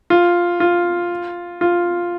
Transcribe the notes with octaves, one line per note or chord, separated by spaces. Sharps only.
F4
F4
F4